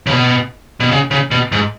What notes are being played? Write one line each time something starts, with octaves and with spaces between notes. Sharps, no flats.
C#3
B2
B2
C#3
C#3
B2
G#2